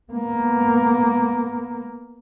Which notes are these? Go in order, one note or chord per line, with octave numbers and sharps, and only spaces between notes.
A#3 B3